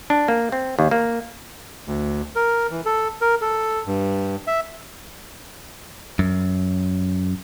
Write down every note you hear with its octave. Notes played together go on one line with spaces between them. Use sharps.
D4
A#3
C4
D#2
A#3
D2
A#4
E3
A4
A#4
A4
G2
E5
F#2